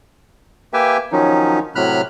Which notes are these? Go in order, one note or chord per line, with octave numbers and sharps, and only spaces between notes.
A#3 G4 B4 E5 G5 G#5
D#3 F3 F#3 C#4 D#4
A2 C3 F#3 B5 F6 F#6